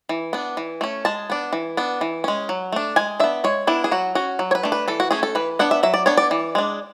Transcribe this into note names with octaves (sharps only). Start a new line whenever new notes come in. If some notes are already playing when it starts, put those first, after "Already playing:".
E3
B3 D4
E3
A3 C#4
G#3 A5
B3 D4
E3
B3 D4
E3
G#3 C#4
F#3
A3 D4
G#3 G#5
B3 D4 E5
G#3 C#5
B3 D4 E4
G#4
F#3 F#4
C#4 F#4
F#3
C#5
B4
A3 D4
B4
E3 A4
F#4
A3 C#4 G#4
A4
E3 B4
B3 D4 F#5
E5
F#3 E5
D5
B3 D4 C#5
D5
E3
G#3 D4